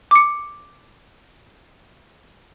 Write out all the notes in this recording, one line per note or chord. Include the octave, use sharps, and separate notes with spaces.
D6 C#7